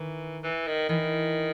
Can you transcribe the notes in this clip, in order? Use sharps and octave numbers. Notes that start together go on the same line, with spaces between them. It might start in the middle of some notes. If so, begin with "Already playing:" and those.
Already playing: D#3 E3
E3
D#3
D#3 E3